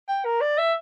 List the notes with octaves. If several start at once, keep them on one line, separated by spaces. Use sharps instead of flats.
G5
A#4
D5
E5